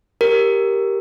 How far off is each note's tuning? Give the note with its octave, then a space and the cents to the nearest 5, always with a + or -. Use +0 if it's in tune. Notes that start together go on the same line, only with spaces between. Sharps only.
G4 +0 A#4 +0